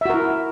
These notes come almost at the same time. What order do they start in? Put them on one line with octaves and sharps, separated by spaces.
E5 F#4 A#4 E4